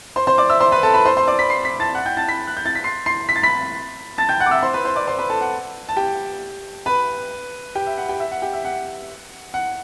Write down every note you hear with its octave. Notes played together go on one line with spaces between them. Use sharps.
C5 C6
C5 C6
D5 D6
E5 E6
C5 C6
B4 B5
A4 A5
B4 B5
C5 C6
C5 C6
D5 D6
B5 B6
C6 C7
B5 B6
A5 A6
F#5 F#6
G5 G6
A5 A6
B5 B6
F#6
G6
A6
B6
C6 C7
C6 C7
B6
A6
B5 B6
A5 A6
G5 G6
F#5 F#6
D6
E5 E6
C5 C6
B4 B5
C5 C6
D5 D6
C5 C6
B4 B5
A4 A5
F#5
A5
G4 G5
B4 B5
G4 G5
E5
F#5
G4 G5
E5
F#5
G4 G5
E5
F#5
F#5